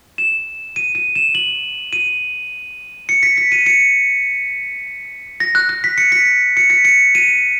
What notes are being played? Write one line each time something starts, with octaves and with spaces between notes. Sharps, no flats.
E7
D#7
D#7
E7
F#7
D#7
C#7
B6
B6
D#7
C#7
A#6
F#6
F#6
B6
C#7
B6
C#7
B6
C#7
D#7